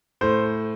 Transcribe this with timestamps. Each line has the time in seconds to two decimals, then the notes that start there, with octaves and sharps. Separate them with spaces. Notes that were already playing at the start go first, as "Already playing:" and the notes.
0.21 A2 C5